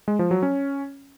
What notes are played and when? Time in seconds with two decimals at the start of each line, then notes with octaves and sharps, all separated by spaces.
0.08 G#3
0.19 F3
0.31 F#3
0.43 C#4